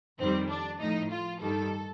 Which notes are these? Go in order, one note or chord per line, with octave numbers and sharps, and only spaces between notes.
F2 D#3 G3 C4
D4
A2 F3 D#4
F4
G2 D#3 G3 A4